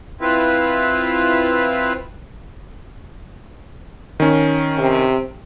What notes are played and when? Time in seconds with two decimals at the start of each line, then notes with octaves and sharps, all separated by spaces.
0.21 C4 E4 F4 B4
4.20 D#3 C#4
4.78 C3